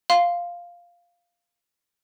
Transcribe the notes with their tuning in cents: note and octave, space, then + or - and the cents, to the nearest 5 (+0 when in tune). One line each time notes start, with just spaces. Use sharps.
F5 +0 C6 +0